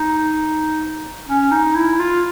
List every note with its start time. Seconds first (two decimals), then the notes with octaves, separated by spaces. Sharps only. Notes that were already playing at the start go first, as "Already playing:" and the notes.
Already playing: D#4
1.28 C#4
1.51 D#4
1.75 E4
1.99 F4